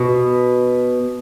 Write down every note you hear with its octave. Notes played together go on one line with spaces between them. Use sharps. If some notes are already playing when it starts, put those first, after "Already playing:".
Already playing: B2